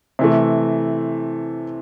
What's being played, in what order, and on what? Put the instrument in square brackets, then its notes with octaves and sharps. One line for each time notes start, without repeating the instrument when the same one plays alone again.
[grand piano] C3 E3 A3